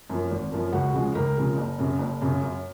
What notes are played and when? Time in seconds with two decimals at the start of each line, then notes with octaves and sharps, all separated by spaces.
0.10 F#2 F3 A#3
0.31 G#1
0.52 F#2 F3 A#3
0.73 C#2 F#4
0.94 C#3 F3 G#3
1.15 C#2 A#4
1.37 C#3 F3 G#3
1.58 F#1
1.79 F#2 C#3
1.99 F#1
2.22 F#2 C#3
2.42 F#2